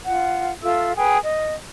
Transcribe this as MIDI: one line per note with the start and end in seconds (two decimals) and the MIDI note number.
0.05 0.52 65
0.05 0.52 78
0.62 0.91 65
0.62 0.91 69
0.62 0.91 76
0.62 0.91 88
0.96 1.17 68
0.96 1.17 71
0.96 1.17 79
1.23 1.54 75